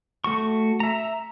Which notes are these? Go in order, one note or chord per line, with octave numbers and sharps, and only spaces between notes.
A3 F#4 C#6
E5 A#5